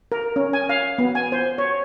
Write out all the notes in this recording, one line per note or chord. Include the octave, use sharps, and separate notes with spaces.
A#4
C#4
G#5
F5
B3
G#5
C5
C#5